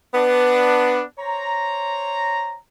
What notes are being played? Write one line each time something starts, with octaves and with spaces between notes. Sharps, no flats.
B3 D4
C5 C#5 A#5